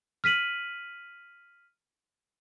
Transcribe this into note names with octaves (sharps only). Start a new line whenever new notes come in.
F6 B6 D#7 F#7